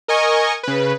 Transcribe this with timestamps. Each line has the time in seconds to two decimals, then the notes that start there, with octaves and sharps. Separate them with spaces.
0.08 A#4 D#5 G#5 C#6
0.63 C#3 B4